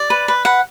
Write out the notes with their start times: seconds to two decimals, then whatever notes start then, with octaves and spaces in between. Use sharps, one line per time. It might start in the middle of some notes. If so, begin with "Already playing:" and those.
Already playing: D5
0.10 B4
0.28 B4
0.45 B4 F#5